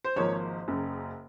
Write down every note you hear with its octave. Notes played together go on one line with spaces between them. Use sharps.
C5
G#1 G#2 F3 A#3 C#5
F#1 F#2 C#3